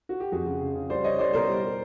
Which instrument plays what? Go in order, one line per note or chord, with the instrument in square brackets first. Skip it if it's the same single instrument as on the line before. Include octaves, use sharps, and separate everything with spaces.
[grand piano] F#4
G4
F2 F#4 G#4
C#3
C#3
C#3
G3 C5 D5
G3 C#5 D#5
G3 C5 D5
B2 A#4 C5
G3
G3